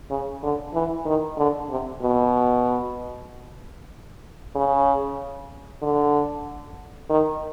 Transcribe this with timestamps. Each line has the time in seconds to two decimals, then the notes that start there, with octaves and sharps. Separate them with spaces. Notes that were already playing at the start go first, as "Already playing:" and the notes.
0.10 C#3
0.43 D3
0.74 E3
1.06 D#3
1.38 D3
1.70 C3
2.01 B2
4.55 C#3
5.82 D3
7.10 D#3